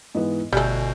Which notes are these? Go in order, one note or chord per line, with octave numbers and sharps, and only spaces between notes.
G#2 E3 B3
G1 B2 G3 A3 G#5 F#6 G6